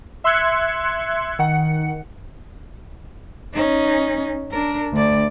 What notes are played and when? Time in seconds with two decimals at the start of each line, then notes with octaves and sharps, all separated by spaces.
0.24 E5 C6 E6 F#6 G#6 C#7
1.39 D#3 F#5 C#7
3.54 C#4 D#4
4.51 D4 A#4
4.93 D2 D5